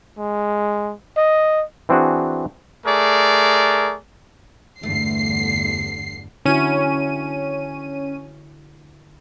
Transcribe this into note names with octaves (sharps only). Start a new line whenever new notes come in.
G#3
D#5
E3 C4 D4 F#4 G#4
A3 G#4 A#4 D5
E2 G2 D3 A3 C7
D3 C#4 E4 F#4 D#7